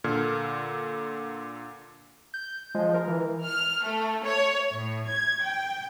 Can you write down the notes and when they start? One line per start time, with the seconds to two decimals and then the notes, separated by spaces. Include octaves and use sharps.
0.04 A#2 D3 A4 F6 G#6
2.34 G6
2.75 F3 G#3
2.94 A#4
3.08 E3
3.45 F6
3.83 A3
4.24 C#5
4.73 A2
5.07 G#6
5.42 G5